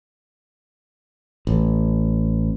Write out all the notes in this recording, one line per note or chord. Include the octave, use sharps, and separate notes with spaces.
A1